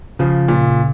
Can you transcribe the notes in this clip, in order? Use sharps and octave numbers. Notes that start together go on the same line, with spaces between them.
C#3 F3
A#2